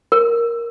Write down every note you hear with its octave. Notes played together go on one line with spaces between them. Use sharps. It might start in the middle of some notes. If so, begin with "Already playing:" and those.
A#4